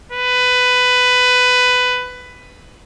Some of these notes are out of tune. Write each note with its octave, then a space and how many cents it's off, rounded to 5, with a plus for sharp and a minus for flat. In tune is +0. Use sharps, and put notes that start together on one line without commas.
B4 +15